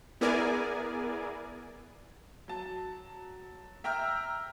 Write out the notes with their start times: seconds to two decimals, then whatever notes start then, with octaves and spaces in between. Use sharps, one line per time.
0.21 B3 E4 G#4 A#4 D5 G#5
2.48 F#3 A5
3.84 E5 G5 A#5 E6 F6